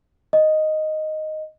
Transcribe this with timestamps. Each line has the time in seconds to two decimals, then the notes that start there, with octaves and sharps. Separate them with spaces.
0.33 D#5